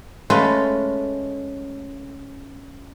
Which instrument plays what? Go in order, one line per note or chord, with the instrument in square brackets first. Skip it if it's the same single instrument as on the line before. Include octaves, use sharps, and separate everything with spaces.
[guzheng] G#3 A3 C#4 F4 A4 B4